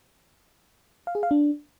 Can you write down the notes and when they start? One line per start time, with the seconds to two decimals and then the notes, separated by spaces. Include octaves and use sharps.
1.07 F5
1.15 G#4
1.23 F5
1.31 D4